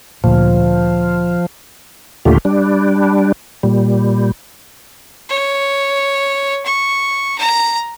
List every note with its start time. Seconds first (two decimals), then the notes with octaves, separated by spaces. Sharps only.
0.24 D2 A#2 F3
2.25 D#2 A#2 D3 A3 F4 G4
2.45 G3 D4
3.63 A#2 G3
5.29 C#5
6.65 C#6
7.38 A#5